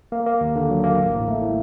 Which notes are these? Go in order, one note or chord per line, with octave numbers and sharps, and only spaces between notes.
A#3
A#3
D#2
D3
F#3
A#3
A1
A2
A3
A2